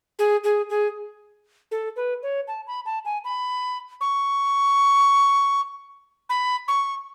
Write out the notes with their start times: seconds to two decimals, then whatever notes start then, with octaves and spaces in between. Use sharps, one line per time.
0.19 G#4
0.44 G#4
0.69 G#4
1.71 A4
1.96 B4
2.23 C#5
2.48 A5
2.67 B5
2.86 A5
3.05 G#5
3.24 B5
4.01 C#6
6.29 B5
6.68 C#6